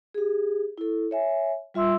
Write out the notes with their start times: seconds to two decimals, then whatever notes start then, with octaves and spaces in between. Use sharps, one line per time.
0.14 G4 G#4
0.78 E4 A4
1.11 C#5 E5 G#5
1.74 G3 F4 E5 C6 E6